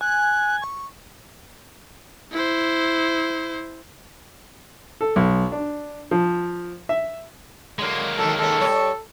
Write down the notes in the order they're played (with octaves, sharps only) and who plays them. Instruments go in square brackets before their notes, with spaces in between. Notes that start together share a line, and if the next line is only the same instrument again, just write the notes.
[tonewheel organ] G#5 [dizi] F#6
[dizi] C#6
[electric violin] E4 C5
[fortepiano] A4
B1
D4
F3
E5
[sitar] D3 F#3 [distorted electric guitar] G#3 A#3
[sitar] D#3 F#3 [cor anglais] A4
[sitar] D#3 C#4 [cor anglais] A4
[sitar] G3 C#5